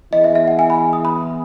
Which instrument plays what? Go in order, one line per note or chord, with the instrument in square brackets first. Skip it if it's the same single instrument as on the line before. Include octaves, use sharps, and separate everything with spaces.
[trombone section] E3 B3 E4 G#4 [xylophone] D#5
[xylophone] E5
E5
F#5
G#5
B5
D#6
B5